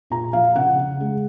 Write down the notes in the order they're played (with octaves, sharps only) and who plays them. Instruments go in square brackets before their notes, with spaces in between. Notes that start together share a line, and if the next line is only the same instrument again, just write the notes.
[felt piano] A#2 A#5
F3 F5
C#3 F#5
C#3
G#3